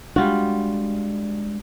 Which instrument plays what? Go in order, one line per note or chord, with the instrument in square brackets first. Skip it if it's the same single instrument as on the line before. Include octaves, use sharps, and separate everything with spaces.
[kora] G3 F4 F#4 [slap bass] G#3 D4